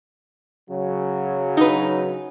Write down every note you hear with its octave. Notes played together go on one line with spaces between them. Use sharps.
C#3 F#3
D#4 B4